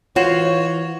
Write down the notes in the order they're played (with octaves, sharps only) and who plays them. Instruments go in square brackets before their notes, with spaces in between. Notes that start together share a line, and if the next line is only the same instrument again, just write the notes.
[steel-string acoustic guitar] E3 F4 [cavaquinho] F#4 C5 [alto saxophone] C#5